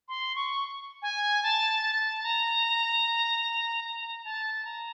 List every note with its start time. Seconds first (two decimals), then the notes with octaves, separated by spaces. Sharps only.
0.08 C6
0.36 C#6
1.02 G#5
1.43 A5
2.23 A#5
3.84 A#5
4.25 A5
4.65 A#5